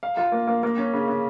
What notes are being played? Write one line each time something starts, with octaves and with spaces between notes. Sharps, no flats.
F5
F4
A#3
A#3
A#3
C#4
C#3
C#3